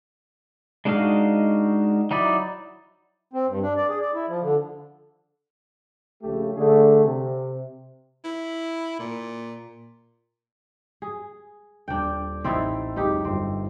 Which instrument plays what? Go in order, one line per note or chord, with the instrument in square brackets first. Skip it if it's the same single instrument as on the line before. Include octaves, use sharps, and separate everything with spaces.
[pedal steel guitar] G#3 D4 D#4 F#4 F5
F#3 D#4 E4 D5
[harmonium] C4
G2
D4
D5
G#4
D5
E4
F3
D3
[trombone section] A#1 C#3 A3 G4
D3 A3 G#4
C3
[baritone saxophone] E4
A#2
[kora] G#4
[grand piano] D#1 G6 [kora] D4 G5
[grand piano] A1 E6 A6 [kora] C4 D#4 E4
[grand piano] C#2 F#2 [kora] D#4 G4
[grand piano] G1 F4 [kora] C4